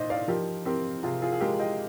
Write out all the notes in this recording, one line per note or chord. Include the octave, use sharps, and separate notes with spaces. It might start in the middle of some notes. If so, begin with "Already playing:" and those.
Already playing: A#2 D#4 C5 D#5
D5 F5
F3 G4 A#4
C4 G4 A#4
C3 F4 G#4
F4 G#4
G#4
G#3 G4 A#4
D#5 G5